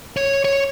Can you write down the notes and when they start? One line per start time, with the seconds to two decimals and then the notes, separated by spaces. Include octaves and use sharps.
0.17 C#5
0.44 C#5